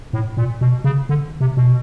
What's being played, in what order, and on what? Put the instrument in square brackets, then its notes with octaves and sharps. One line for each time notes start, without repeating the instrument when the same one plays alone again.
[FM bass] A2
A#2
B2
C#3
D3
C3
B2